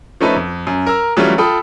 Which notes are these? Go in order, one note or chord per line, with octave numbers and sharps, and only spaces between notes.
F3 A3 C#4 D#4 A4 B4
F2
F#2
A#4 A#5 E6
E3 F#3 G3 A3 C#4 F4
F4 A4 G5 B5 D#6